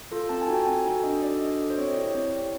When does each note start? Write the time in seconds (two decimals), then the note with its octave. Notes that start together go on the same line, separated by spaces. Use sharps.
0.12 F4 A4
0.29 C4 A5
0.42 G#5
0.48 D#4 F#4 A4
0.54 G5
0.66 C4 G#5
0.85 D#4 F#4 A4 G#5
1.03 D4 D#5
1.22 F#4 A4 D5
1.41 D4 D#5
1.59 F#4 A4 D5
1.70 C5
1.78 C4 C#5
1.87 D#5
1.96 E4 D5
2.01 G4
2.06 C#5
2.14 C4
2.33 E4 G4